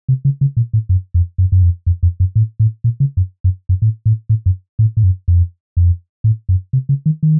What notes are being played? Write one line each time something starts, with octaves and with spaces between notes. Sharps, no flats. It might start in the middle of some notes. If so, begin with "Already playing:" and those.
C3
C#3
C#3
A#2
A2
F#2
F2
F#2
F#2
F2
F2
F2
F#2
A2
A2
A#2
C#3
F#2
F#2
F#2
A2
A2
A2
F#2
A2
A2
F#2
F2
F2
A2
F#2
C3
C#3
D#3
D#3